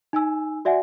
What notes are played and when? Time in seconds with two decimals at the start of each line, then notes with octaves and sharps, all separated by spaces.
0.13 D#4 G#5 E6
0.65 F#4 D5 E5 F#5 G#5